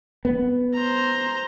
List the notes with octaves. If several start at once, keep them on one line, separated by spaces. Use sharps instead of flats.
B3
C5 A#5